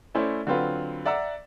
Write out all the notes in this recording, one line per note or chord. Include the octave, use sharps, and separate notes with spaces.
A3 C#4 E4 C5 D5
D3 F#3 C4 F4 B4
D5 E5 F#5 A#5 E6